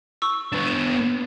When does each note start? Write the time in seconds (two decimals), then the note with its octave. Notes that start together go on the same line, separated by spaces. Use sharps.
0.22 C#6 E6
0.52 B3 D4
0.67 D#7 E7